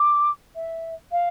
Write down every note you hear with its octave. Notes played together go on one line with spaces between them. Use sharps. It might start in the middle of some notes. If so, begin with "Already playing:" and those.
Already playing: D6
E5
F5